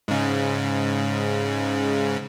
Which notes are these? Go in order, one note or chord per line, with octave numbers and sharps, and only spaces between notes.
G#2 C#3